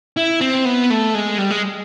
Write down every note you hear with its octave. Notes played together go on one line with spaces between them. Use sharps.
E4
C4
B3
A3
G#3
G3
G#3